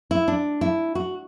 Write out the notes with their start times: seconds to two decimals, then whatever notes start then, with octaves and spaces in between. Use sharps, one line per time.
0.11 E4
0.28 D4
0.61 E4
0.95 F#4